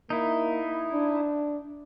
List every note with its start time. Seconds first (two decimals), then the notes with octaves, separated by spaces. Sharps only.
0.10 A#3 D#4 E4
0.93 D4